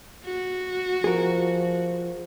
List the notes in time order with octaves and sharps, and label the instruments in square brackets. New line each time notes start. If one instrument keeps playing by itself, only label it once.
[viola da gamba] F#4
[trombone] F3 [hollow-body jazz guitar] G#4 A#4